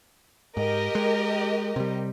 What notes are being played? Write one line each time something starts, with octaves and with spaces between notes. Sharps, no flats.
G#2 G4 A#4 D#5
G#3
C3 G3